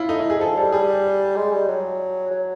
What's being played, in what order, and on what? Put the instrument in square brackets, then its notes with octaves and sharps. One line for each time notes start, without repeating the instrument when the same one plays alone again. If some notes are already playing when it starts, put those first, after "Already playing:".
Already playing: [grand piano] E4 F4
[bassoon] A3 [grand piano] D#4
[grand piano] E4
G#4
[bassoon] F3 [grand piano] A4
[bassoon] G3 [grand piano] A4
[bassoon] G3 [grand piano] G#4
[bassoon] G#3
G3
F#3
F#3